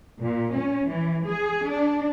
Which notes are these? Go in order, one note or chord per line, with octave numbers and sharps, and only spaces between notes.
A#2
C#4
E3
G#4
D4